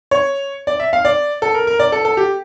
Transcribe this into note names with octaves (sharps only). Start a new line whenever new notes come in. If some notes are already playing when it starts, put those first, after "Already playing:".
C#5
D5
E5
F5
D5
A4
A#4
A#4
D5
A4
A4
G4